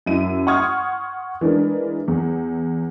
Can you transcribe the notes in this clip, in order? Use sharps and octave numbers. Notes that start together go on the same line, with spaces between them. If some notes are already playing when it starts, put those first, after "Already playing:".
F#2 E4 E5 D#7
F#5 C6 C#6 D#6 F6 G#6
E3 G#3 D4 A#4
E2